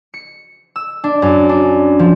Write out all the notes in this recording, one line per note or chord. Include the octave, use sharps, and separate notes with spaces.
C#7
E6
D4
F#2
D4
F3